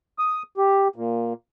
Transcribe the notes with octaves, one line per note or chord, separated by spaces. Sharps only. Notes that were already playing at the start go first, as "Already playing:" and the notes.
D#6
G4
A#2